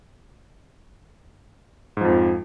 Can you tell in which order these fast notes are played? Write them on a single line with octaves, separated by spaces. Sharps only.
G#2 F3 F2